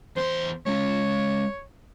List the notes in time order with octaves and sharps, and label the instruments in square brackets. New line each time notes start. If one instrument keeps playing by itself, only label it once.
[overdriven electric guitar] E2 C6 [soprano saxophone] C5
[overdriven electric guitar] G#3 C#4 [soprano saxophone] C#5